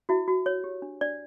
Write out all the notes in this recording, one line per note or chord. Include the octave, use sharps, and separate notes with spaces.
E4 F#4 E5
F#4
C#5
G4
D4
D4 D5